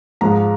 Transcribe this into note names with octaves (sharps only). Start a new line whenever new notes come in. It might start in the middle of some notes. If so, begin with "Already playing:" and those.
G#2 F3 G#3 A#5